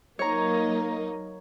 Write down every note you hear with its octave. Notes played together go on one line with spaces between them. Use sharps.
F#3 A#3 D#4 C#5 A#5